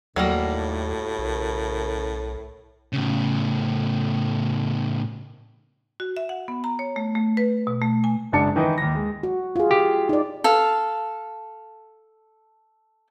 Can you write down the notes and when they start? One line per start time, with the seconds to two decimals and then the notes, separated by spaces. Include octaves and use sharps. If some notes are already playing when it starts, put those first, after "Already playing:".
0.16 D#2 A2 D#3 F#3 G3 A3 A#3
1.19 B1 C#3 A4 A#4
2.93 A2 C#3
6.00 F#4
6.17 E5
6.29 F#5
6.48 B3
6.64 A#5
6.79 C#5
6.96 A3
7.15 A3
7.37 B4
7.67 B2
7.81 A3
8.04 G#5
8.32 F#1 F#2 G#3 D4 A5 C#7
8.56 D#3 E3 D#4 D#5
8.78 D#2 A#6
8.95 G#3
9.23 F#4
9.56 F4 G#4
9.71 G4
10.09 D#4 D5
10.44 A4 F5